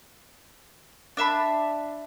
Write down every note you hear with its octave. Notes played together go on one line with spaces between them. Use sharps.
D4 E5 A5 B5